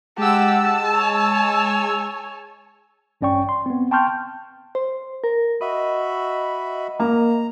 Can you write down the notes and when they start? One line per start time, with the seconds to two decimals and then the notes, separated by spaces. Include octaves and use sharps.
0.18 G#3 G4 F#5 A5 E6
0.94 C#5 G#5
3.21 A1 G2 C#4 D5 G5 C#6
3.49 C6
3.66 B3 C4
3.91 G5 A5 C6 C#6 F6 G6
4.75 C5
5.24 A#4
5.61 F#4 D#5 E5 B5
7.00 A#3 A#5